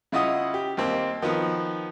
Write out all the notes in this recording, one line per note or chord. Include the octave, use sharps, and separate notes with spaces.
C#3 E4 F4 D#5 F#5 D#6
G4
D#2 A#3 C4
D#3 F3 B3